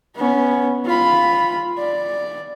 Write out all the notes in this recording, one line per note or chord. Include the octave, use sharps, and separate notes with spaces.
B3 C#4
F4 B5
D5